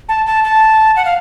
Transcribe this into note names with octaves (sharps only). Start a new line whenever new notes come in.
A5
A5
A5
F#5
F5